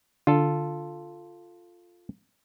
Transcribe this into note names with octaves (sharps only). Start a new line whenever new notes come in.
D3 F4 A4